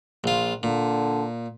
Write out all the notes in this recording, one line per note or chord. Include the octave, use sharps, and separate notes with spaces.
A#1 F4
A#2 D3